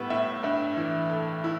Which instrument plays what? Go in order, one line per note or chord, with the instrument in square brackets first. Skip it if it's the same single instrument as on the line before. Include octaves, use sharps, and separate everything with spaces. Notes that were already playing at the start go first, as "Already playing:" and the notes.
Already playing: [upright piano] A2 G3 B3 [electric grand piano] E5
[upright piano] A2 [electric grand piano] E5
[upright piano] G2 [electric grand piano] E5
[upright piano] E3
A3
E4